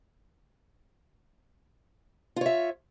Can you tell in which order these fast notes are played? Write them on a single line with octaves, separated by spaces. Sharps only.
F4 C#5 E5